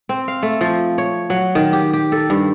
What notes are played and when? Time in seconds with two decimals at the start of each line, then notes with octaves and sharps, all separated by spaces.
0.09 C4
0.28 F5
0.43 A3
0.61 F3
0.98 C#5
1.30 F#3
1.55 D#3
1.73 G4
1.93 G4
2.12 A4
2.30 G2